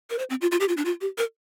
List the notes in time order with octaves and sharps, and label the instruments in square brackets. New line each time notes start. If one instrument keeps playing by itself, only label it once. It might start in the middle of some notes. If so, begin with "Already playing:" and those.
[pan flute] A#4
C5
C4
F4
F4
G4
F4
D4
F4
G4
A#4